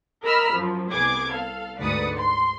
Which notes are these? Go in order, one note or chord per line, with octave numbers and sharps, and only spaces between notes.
A#4 D#5 A#5 B5 E6 F6
F#2 F3
C2 B3 G#4 D6 G#6
A4 F5
D2 G#2 B4 D5 D#6 C#7
C6